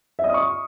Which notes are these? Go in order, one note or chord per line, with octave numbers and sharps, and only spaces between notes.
E5
D#5
D#6
C#6